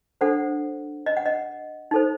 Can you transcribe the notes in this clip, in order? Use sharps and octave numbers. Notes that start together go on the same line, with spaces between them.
D4 A4 C5 F#5
D#5
F#5
D#5
D#4 A4 C5